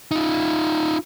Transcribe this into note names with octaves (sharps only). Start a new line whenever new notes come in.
D#4 F4